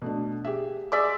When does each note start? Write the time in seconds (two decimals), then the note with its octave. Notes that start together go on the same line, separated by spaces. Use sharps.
0.02 B2 A3 D4
0.44 G4 G#4 E5
0.92 G#3 D5 E5 D6